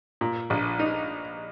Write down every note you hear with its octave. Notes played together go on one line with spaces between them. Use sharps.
A#2
A#1
D#4